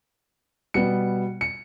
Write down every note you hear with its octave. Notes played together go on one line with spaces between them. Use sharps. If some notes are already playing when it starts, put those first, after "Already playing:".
B2 G3 B3 C#7
C#7